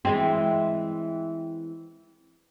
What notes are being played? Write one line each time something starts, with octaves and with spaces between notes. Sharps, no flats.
E3 G#3 C4